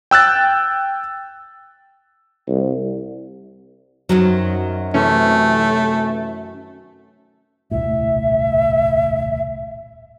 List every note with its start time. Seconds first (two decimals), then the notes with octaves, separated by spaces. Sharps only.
0.11 G5 E6 F#6 A6
2.48 C2
4.09 F#2 D#3 F#3 C4
4.94 C3 E3 A3 C#4
7.71 D#1 C2 A2 E5